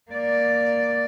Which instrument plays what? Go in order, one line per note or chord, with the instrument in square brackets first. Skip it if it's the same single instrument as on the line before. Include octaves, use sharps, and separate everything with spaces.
[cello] A#3 D5